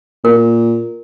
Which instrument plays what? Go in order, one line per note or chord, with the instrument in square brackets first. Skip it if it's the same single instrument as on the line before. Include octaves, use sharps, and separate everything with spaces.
[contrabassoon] A#2 [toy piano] A#4